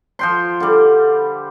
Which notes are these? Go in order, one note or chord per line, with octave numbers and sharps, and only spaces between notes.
F3 G5 C6
D3 G3